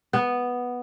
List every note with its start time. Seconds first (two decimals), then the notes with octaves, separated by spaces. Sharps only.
0.13 B3